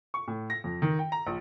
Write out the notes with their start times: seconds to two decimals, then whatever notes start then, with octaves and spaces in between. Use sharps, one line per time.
0.14 C#6
0.28 A2
0.50 A#6
0.64 F2
0.82 D#3
0.99 G5
1.12 A#5
1.27 A#1